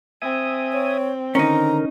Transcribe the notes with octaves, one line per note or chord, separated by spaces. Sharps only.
C4 E5 G#5 D#6
C#5
D3 D#3 C#4 D#4 A#4 A#5